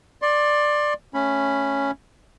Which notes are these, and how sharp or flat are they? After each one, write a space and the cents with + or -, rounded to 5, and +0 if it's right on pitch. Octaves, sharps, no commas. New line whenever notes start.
D5 +10 C6 +30
A3 +0 C#4 +0 B5 +0